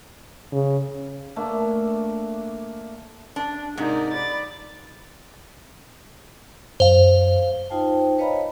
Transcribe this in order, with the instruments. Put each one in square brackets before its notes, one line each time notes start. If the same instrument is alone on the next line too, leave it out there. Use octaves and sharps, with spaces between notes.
[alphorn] C#3
[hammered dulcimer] A3 A#3 D4
[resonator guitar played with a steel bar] D4
[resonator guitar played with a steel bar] G#2 C3 [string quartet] D#4 A#4 D5
[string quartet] D5 B5 A6
[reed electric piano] F#2 [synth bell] C5 F5
[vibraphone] D#4 F4 C5 G5 A5
B4 C#5 D#5 F5 A#5 B5